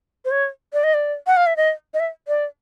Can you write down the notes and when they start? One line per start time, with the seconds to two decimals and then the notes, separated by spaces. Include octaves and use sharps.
0.25 C5
0.31 C#5
0.73 D5
0.84 D#5
0.94 D5
1.27 F#5
1.37 F5
1.46 E5
1.57 D#5
1.94 D#5
2.00 E5
2.28 D5